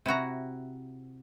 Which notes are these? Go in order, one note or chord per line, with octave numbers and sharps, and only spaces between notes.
C3 E4 F#4 A#5